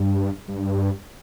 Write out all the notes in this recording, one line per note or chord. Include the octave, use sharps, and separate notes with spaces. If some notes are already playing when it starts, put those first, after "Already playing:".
Already playing: G2
G2